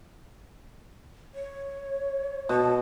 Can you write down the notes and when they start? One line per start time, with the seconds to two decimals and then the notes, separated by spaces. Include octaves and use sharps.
1.34 C#5
2.49 B2 A5